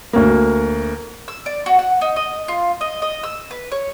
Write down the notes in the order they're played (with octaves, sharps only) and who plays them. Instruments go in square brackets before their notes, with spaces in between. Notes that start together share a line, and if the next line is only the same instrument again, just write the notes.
[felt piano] D2 A#3
[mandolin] E6
D5
F#4
F#5
D#4
D#5
F4
D#5
D#5
E6
B4
C#5